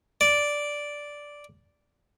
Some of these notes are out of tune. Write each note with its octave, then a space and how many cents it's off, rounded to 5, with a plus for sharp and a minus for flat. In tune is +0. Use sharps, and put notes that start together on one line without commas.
D5 -5